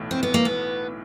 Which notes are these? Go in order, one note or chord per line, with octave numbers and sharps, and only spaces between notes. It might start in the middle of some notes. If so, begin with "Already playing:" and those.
Already playing: B1 A2 E3 A3
C4
B3
A#3
B3